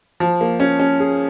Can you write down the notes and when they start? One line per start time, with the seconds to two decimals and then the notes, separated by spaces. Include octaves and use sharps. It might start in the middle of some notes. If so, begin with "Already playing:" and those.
0.20 F3
0.41 A#3
0.60 C#4
0.80 C#4
1.00 G#4